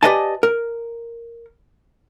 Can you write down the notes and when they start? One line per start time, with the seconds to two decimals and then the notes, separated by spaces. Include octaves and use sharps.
0.03 G4 B4 D5 D#5 G#5 A5
0.43 A#4